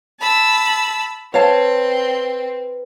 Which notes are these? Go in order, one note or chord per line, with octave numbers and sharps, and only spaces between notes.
A5 B5 E6
C4 B4 C#5 F5 A5